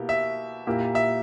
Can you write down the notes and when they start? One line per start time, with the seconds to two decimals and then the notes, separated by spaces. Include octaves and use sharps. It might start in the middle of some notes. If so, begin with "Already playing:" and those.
Already playing: B2 A#3 E4 G4
0.09 E5
0.67 A#2 A#3 E4 G4 A#4
0.95 E5